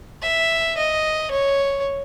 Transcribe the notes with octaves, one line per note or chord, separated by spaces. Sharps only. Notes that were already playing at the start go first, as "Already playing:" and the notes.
E5
D#5
C#5